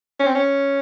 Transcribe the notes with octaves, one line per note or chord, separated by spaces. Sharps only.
C#4
C4
C#4